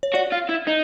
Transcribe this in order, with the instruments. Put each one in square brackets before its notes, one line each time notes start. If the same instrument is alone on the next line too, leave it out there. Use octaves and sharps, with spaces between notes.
[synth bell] C#5
[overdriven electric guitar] F#4 [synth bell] D5
[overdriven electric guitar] F4
E4
D#4